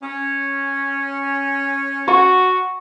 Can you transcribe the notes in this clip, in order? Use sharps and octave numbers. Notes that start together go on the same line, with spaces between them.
C#4
F#4 C#6